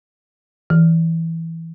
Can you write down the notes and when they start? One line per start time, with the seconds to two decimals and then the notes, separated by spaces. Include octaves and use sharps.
0.70 E3